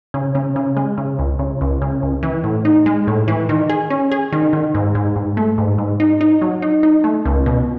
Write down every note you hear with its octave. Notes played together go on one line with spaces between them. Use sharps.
C#3
C#3
C#3
G#3
C#3
C#2
C#3
C#2
C#3
C#2
E3
A2
D#4
G#3
A2
E3
D#3
G#4
C#4
G#4
D#3
D#3
G#2
G#2
G#2
A3
G#2
G#2
D#4
D#4
F#3
D#4
D#4
A3
C#2
B2